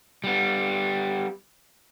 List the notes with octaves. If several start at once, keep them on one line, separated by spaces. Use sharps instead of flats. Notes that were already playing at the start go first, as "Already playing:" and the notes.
G3 B3